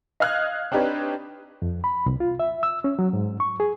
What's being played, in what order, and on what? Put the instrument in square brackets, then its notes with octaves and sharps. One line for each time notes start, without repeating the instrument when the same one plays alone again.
[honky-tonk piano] D#5 F5 D#6 F6 F#6 G#6
C4 D4 D#4 G4 B4 C#5
[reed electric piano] F2
B5
C2
F4
E5
E6
C#4
F#3
G#2
C#6
G#4